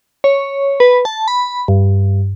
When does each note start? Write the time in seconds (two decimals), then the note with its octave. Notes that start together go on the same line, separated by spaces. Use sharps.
0.24 C#5
0.80 B4
1.05 A5
1.28 B5
1.68 G2